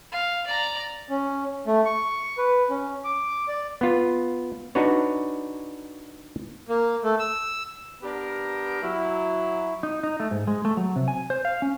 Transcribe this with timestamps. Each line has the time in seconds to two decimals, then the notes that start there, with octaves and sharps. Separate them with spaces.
0.12 F5
0.47 D5 A#5
1.09 C#4
1.67 A3
1.85 C#6
2.38 B4
2.70 C#4
3.04 D6
3.48 D5
3.81 B3 F4
4.75 D4 D#4 F#4 B4 C#5
6.69 A#3
7.04 A3
7.19 E6
8.03 B3 D4 G4 A#4
8.82 F#3 E4
9.83 D#4
10.03 D#4
10.20 A3
10.31 G#2
10.47 G#3
10.65 A3
10.77 F#3
10.96 C3
11.08 G#5
11.30 C5
11.45 F5
11.62 C#4